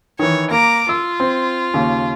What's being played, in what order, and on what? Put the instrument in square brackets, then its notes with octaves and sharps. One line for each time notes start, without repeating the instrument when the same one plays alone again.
[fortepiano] D#3 E3 [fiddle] C#5
[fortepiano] A#3 [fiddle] A#5 D6
[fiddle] F4 [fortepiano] E6
[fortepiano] C4
D#2 C#3